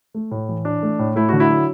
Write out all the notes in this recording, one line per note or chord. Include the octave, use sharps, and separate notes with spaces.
A3
A2
E3
D4
A3
A2
A3 E4
D3 F#4
E4
F#3